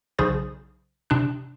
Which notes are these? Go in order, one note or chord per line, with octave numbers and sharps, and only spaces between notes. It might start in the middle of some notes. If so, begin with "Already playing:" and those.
B1 C#3 G#4 C5 A6
C3 D4 F#6